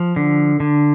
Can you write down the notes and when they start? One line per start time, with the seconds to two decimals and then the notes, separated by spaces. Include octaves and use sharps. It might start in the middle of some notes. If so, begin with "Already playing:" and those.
Already playing: F3
0.16 D3
0.60 D3